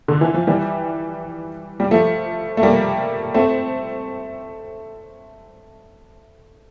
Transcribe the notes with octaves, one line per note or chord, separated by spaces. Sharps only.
D3
E3
F3
E3 G3
G3
F3 A3
A3
G3 A#3
A3 C4